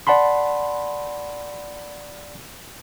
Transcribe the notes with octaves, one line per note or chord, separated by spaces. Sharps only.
D5 F#5 A5 B5 C6